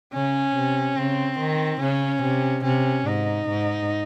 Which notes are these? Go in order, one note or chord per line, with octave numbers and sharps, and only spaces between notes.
C#3 C#4
C3
C#3 C4
D#3
C#3 C#4
C3
C3 C#4
G#2 D#4
G#2